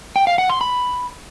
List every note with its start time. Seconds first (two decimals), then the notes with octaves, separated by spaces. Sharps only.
0.16 G5
0.27 F5
0.38 F#5
0.50 C6
0.61 B5